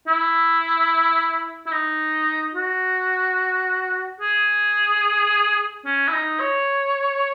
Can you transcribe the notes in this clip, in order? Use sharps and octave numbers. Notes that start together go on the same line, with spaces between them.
E4
E4
D#4
F#4
G#4
C#4
E4
D#4
C#5